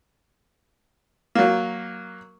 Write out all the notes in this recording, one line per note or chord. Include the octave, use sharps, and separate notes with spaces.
F#3 A#3